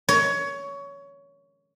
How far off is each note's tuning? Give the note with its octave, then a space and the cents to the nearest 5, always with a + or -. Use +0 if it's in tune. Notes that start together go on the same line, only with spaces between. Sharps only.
C#5 +20